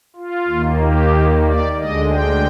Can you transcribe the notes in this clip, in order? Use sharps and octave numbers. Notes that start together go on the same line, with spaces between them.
F4
D#2 D#3 A#3
G4
D5
D2 D3 G#3 D#5
G5